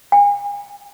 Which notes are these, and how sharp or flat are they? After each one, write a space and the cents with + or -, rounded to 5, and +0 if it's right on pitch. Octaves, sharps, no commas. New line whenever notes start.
G#5 -40